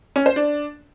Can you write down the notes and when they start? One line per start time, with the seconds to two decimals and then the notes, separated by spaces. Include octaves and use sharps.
0.16 C#4
0.26 C5
0.36 D4